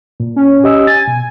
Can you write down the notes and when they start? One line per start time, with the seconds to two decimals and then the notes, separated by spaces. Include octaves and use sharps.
0.20 A#2
0.36 C#4
0.64 G4 D#5 E6
0.87 G#5 A6
1.07 B2